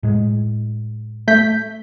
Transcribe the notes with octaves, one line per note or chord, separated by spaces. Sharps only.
A2 G#3
A3 G6 B6